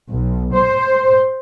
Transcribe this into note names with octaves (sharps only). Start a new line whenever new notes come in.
B1
C5